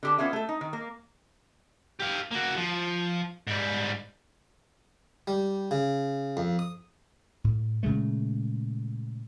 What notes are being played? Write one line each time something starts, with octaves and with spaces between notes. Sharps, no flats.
D3 G4 A5
B3 C#4 F4 G#4 E5
A3 A4
D#4
D#3
A#3
G4 F5
A#3 F#4
F3
G#2 G3
G3
C#3
F2
D#6
A2
A#2 C#3 G#3 A3